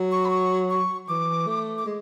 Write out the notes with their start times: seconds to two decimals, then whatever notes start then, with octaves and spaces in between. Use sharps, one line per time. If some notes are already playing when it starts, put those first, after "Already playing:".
Already playing: F#3
0.11 C#6
0.25 B5
0.30 C#6
0.70 C#6
1.09 E3 D6
1.47 A3
1.78 D6
1.86 G#3